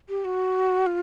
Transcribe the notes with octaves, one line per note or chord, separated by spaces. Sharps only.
G4
F#4
F4